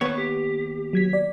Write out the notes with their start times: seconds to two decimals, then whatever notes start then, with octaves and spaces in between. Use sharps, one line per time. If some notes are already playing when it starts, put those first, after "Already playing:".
0.01 D#2 B3 B4 C#5
0.18 G4
0.93 F#3 G#6 B6
1.13 D5